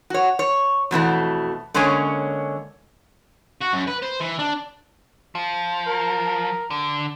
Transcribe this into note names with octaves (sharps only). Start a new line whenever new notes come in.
F#4 C#5
C#5
F2 B2 E3 A3
D3 G#3 A#3 C#4 C#5 G#5
F#4
F#2
B4
C5
E3
D4
F3
A#4
D3